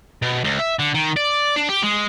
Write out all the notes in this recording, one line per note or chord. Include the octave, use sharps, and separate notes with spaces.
B2
C#2
E5
D3
D#3
D5
D4
G4
G#3